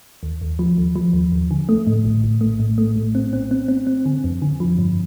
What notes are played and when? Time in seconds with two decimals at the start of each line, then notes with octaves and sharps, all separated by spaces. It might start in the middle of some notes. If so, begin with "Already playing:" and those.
0.23 D#2
0.41 D#2
0.59 F3
0.78 D#2
0.96 F3
1.13 D#2
1.32 D#2
1.51 D3
1.69 A3
1.87 A2
2.05 A#1
2.24 A#1
2.41 A3
2.60 A2
2.78 A3
2.96 A#1
3.15 C4
3.33 C4
3.51 C4
3.68 C4
3.87 C4
4.06 D3
4.24 F2
4.42 D3
4.60 F3
4.78 G2